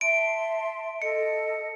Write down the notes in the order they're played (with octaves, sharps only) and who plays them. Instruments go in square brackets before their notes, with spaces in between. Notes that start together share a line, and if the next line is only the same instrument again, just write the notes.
[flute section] E5 A5 C6 [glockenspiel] D7
[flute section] A4 D#5 [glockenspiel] C#7